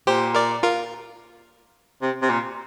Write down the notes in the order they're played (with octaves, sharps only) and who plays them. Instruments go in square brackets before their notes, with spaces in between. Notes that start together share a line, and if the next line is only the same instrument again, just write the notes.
[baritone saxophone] A#2 [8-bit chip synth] G4 C5
[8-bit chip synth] A#4 D5
F4 A#4
[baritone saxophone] C3
C3
A#2